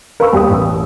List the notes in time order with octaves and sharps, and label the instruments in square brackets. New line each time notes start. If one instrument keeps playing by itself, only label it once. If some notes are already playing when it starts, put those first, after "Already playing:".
[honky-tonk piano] A#4 B4 F5 B5 C#6 E6
D#2 G3 G4 B4 D#6
A1 E6